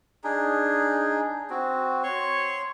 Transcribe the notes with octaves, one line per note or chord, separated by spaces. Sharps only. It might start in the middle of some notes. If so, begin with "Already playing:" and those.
D4 D#4 G#4
C4 F#4
C#5 C6 C#6